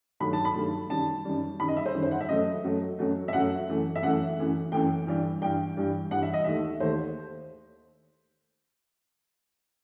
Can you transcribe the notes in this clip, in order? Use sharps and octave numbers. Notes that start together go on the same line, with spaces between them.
G2 D#3 F#3 A3 B5
A5
B5
G2 D#3 F#3 A3
F#2 D#3 G3 A5
F#2 D#3 G3
F#2 D#3 G3 B5
D#5
E5
C5
F#2 D#3 G3
C5
F#5
E5
F#2 F#3 A3 D#5
F#2 F#3 A3
F#2 F#3 A3
E5
F#2 F#3 A3 F#5
F#2 E3 A3
E5
F#2 E3 A3 F#5
F#2 E3 A3
F#2 E3 A3 G5
G2 E3 G3
G2 E3 G3 G5
G2 E3 G3
G2 E3 G3 F#5
E5
D#5
D#2 D#3 A3 E5
D#2 D#3 A3 C5